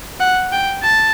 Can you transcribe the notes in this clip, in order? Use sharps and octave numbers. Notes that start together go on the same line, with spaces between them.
F#5
G5
A5